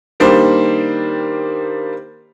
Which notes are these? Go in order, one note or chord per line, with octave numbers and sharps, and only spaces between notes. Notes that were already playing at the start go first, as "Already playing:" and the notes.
D#3 G3 A#3 D4 C5